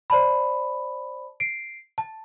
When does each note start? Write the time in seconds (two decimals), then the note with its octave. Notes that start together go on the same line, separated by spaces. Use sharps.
0.10 C5 D5 A5 B5
1.40 C7 D7
1.98 A5